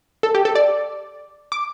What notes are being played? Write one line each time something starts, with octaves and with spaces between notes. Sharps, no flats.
A4
G4
A4
D5
D6